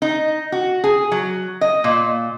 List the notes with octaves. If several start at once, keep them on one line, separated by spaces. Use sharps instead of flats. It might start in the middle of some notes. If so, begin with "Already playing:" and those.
D#4
F#4
G#4
F#3
D#5
A#2